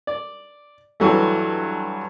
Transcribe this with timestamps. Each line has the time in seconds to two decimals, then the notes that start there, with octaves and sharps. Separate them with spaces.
0.07 D5
1.00 G2 E3 F#3 A3